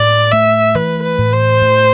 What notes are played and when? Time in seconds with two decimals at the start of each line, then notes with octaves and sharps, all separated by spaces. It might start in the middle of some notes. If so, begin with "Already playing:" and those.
Already playing: A2 D5
0.32 A3 E5
0.75 E3 B4
1.03 B4
1.18 A2
1.33 C5
1.61 A2